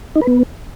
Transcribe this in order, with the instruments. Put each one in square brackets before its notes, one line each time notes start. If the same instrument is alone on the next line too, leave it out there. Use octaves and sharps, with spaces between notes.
[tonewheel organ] D#4
B4
B3